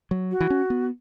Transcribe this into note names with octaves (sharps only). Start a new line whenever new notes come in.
F#3
F#4
E3
C#4
B3